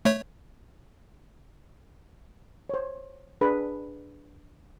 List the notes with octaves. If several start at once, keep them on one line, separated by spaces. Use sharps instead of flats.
A3 C#5
C5 C#5
D4 G#4 B4 B5